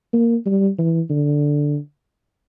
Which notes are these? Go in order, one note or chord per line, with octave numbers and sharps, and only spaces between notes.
A#3
G3
E3
D3